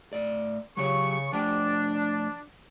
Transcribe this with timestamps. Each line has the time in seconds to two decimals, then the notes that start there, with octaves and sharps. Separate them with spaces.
0.13 A2 D5
0.77 C#3 F#3 G4 C#5 C#6
1.33 F3 A3 D4 G5